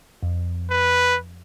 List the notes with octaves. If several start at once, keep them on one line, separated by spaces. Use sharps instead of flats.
F2
B4